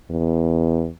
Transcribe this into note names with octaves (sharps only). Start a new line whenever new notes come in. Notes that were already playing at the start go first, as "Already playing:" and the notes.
E2